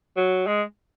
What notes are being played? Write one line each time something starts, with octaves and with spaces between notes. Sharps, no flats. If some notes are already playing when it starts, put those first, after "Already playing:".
F#3
G#3